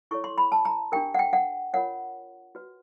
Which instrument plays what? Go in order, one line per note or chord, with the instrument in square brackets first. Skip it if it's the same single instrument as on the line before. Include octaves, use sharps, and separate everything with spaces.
[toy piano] E4 A4 C#5 C#6
C6
B5
A5
A#5
D4 G4 A#4 G5
F#5
G5
F#5
F4 A#4 C#5 F#5
F#4 B4